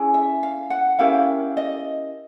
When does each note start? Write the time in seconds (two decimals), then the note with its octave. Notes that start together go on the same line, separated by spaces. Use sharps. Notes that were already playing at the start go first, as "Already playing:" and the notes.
Already playing: C#4 E4 G#4
0.14 E5
0.43 F5
0.70 F#5
0.99 C#4 E4 G4 A#4 F5
1.57 D#5